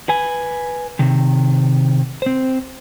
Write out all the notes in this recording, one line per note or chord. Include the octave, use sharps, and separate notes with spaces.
B4 G#5
C3 D#3
C4 C5